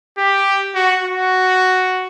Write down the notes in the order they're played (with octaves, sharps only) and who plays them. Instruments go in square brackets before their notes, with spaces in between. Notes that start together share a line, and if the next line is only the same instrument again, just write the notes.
[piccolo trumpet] G4
F#4
F#4